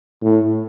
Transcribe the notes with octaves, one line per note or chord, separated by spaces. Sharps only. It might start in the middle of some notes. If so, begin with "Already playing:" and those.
A2